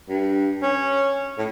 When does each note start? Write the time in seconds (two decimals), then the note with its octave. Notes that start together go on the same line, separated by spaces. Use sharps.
0.09 G2
0.62 C#4
1.38 A2